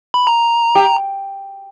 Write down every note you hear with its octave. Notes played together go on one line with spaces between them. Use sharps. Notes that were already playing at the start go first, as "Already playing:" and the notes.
B5
A#5
G4